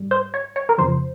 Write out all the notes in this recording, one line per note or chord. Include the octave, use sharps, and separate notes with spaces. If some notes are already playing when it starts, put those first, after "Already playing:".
Already playing: G#2 G3
C5
C#5
C#5
A#4
F2 C#3 F3 C5